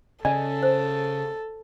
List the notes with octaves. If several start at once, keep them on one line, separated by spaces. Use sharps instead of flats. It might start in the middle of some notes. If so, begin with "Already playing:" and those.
C#3 A4 D5 D#5 G#5
C5